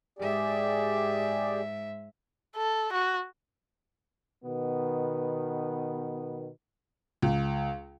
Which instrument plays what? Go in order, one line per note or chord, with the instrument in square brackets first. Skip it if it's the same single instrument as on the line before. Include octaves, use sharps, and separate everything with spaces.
[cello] G#2 E5 [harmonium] G4 G#4 D5
[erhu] A4
F#4
[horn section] B2 D#3 B3
[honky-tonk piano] C#2